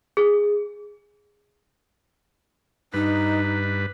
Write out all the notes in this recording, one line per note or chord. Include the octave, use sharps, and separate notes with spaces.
G#4
G2 D#4 B4